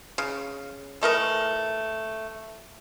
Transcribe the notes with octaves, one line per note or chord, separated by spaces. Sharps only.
C#3
E3 A3 A#4 D#5